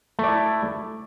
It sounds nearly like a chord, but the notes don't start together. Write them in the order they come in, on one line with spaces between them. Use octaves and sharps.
A3 D5 E4